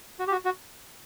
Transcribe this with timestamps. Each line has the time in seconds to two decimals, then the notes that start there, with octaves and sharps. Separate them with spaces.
0.19 F#4
0.27 G4
0.32 F#4
0.45 F#4